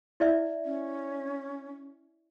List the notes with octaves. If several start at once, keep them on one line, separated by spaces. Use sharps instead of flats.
E4 D5 E5
C#4